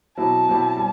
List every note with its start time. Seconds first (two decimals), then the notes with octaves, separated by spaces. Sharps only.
0.18 B2 F#3 C4 E4 G4 A5
0.48 B2 F#3 C4 E4 G4
0.77 G3